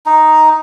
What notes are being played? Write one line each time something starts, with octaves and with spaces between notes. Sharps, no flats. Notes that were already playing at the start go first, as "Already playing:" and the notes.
D#4